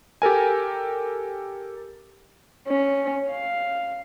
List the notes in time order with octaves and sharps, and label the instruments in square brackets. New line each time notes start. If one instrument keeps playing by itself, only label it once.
[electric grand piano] G4 A4 A#4 G#5
[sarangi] C#4
F5